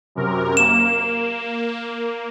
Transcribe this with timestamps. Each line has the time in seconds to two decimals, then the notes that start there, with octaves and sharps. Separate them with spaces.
0.15 F#2 C3 A#4
0.57 A#3 E7